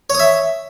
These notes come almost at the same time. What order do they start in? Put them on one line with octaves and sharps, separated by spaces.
C#5 D#6 E5